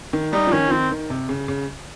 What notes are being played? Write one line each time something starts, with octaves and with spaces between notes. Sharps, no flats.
D#3
G3 D#4
F3
D#3 C#4
F3
D#3 C4
D#3
C3
C#3
C#3